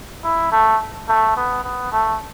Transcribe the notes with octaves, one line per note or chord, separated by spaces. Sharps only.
E4
A3
A3
B3
B3
A3